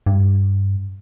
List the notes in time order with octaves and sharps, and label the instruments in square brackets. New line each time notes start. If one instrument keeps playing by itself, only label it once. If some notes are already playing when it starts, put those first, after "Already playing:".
[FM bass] G2